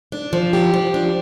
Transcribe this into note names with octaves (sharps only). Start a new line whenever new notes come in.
D4
F3
G4
F3
D4